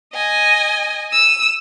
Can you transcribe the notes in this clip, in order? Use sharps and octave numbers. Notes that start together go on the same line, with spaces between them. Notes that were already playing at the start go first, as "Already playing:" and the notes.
D#5 G#5
E6 D#7